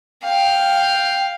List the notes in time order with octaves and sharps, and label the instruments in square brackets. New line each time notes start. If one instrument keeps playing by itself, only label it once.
[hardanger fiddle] F5 [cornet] G5